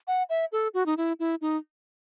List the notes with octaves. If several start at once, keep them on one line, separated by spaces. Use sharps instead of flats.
F#5
E5
A4
F#4
D#4
E4
E4
D#4